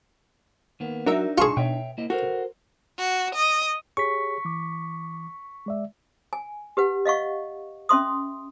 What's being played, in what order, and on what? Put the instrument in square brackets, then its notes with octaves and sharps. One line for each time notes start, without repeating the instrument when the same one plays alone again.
[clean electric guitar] D#3 A#3 B3
[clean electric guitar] F#3 [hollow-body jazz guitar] D4 D#4 [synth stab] F#4 A#4 E5
[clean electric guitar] B1 G#5 A5 [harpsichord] F4 G#4 [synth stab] C6 C#6
[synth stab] B2 [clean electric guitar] C#5 E5 G5
[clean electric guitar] A#3 E4 D#5
[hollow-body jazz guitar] F#4 [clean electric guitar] A4 A#4 C5
[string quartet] F#4
D#5
[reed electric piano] G4 G#4 C#5 [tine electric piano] C#6 B6
[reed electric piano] E3 D6
G#3 D5 E5
[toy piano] G#5
G4 B4 F#5
D#5 F5 F#5 C#6
C#4 E5 C6 D#6